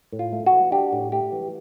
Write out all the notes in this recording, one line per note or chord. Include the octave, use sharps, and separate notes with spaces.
A2
F4
A3
F#4
E3
D4 G4
A2
A3 G4
E3